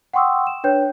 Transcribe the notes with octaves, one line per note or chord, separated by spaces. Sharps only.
F#5 G5 C6 C#6 D#6 E6
E7
D4 B4 C#5 G5 G6